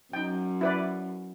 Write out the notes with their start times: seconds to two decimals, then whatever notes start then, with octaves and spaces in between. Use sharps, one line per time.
0.13 F#2 D#4 G5
0.61 E4 B4 D5